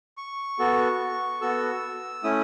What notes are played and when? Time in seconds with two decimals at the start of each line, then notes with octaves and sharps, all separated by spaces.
0.17 C#6
0.59 B3 F#4 A4
1.41 B3 F#4 A4 E6
2.23 A3 C#4 E4 D#6